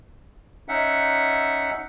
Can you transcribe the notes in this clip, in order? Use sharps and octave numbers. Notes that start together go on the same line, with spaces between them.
C#4 D#4 E5 F#5